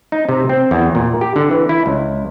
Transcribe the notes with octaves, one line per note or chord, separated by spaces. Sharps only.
D#4
C3
C4
E2
A#2
G4
D3
E3
E4
C#2